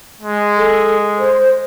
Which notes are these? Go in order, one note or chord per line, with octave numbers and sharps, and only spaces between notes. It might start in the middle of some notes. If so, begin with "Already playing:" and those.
G#3
A4
C5